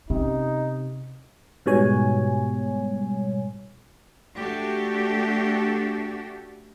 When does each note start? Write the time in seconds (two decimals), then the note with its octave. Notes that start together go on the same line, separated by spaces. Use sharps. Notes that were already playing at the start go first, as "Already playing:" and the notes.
0.10 C3 C#4 D#4
1.66 G#2 B2 G3 C#5 G#5
4.35 A3 D4 F#4 G4 A4